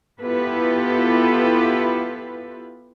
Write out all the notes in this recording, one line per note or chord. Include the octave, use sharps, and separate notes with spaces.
B3 E4 F4 G4 A4 B4